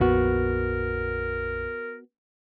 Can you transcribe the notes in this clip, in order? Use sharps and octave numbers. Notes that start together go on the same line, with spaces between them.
A#1 F2 A#2 B3 F#4 A#4